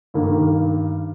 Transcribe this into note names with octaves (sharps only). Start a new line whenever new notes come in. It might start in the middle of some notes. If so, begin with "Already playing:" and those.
G2 D#3 A#3